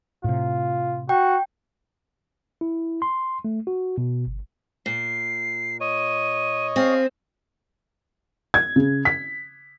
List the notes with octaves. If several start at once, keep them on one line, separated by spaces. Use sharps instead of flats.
A2 C3 F4
F#4 G5
E4
C6
A3
F#4
B2
G1
A#2 C7
C#5 D#5 D#7
C4 G#4 F5
G#6
C#3
B6